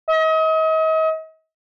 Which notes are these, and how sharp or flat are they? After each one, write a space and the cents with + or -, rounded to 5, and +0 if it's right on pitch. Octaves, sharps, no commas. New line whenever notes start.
D#5 +40